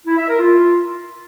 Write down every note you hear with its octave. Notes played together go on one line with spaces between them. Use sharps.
E4
E5
A#4
F4